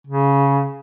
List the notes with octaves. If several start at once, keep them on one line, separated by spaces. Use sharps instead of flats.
C#3